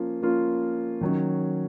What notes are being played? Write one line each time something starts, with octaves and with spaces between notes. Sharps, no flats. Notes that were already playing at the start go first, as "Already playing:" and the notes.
Already playing: F3 A#3 C#4 F4
F3 A#3 C#4 F4
D#3 F#3 C#4